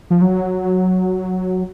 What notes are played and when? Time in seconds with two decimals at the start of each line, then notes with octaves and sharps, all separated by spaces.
0.10 F3
0.22 F#3